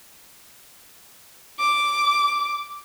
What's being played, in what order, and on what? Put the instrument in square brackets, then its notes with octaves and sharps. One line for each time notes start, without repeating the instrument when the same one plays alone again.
[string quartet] D6